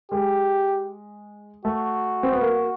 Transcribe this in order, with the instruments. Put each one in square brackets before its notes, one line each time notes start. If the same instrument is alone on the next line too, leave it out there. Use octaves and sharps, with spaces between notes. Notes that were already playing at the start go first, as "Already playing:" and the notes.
[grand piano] G#3 [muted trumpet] G4
[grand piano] A3 [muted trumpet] F#4
[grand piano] C4
B3
A#3